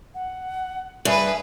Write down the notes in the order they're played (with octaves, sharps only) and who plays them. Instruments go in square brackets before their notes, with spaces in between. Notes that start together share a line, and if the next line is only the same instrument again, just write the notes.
[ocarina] F#5
[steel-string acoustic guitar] G2 [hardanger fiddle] G#4 B4 [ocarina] E5